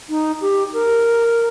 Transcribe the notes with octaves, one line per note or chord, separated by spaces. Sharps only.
D#4
G4
A#4